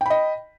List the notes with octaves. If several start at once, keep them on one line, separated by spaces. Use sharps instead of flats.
D#5 G5 B5